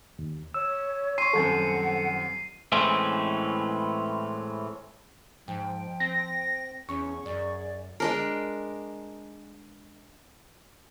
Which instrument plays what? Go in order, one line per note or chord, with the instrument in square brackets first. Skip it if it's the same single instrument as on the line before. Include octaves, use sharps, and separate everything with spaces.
[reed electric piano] D#2
[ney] C#5 [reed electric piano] E6
[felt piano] C6 C#6 [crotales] C7 D#7
[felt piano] D#1 F#2 C4 [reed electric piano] A4 [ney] F#5
[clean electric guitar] A2 E3 G#3 A3 C4 C#4
[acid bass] G#2 [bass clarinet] F3 [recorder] G5
[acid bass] C4 [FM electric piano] A#6
[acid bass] E2 [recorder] C#4 [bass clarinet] G#4 [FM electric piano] C#6
[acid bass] F#2 [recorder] D5
[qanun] G#3 D4 A#4